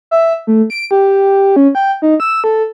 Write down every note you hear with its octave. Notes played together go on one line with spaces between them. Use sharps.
E5
A3
D7
G4
C#4
G5
D#4
E6
A4